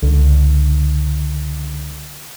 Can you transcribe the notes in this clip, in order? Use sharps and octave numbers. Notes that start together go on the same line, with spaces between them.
C#2 D3